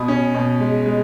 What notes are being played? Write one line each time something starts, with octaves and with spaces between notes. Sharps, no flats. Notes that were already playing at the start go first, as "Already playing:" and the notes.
Already playing: B2 B5 D#6
C#4
B2
G#3
G#3